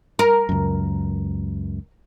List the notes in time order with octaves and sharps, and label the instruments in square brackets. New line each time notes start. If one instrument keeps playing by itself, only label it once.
[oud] A#4
[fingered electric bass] C#2 F#2